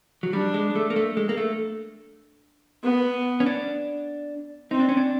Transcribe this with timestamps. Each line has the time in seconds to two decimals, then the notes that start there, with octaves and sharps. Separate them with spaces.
0.23 F#3
0.33 G3 D4
0.54 G#3
0.76 A3
0.90 A#3
0.96 A3
1.17 G#3
1.29 A#3
1.37 A3
2.83 B3
3.40 C#4
3.46 D4
4.71 C4 D#4
4.79 D4
4.89 C#4
4.97 D4